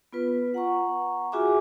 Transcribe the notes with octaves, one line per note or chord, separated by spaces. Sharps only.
B3 F4 B4
F#5 A#5 C#6
F4 F#4 G#4 E5 G#5 D6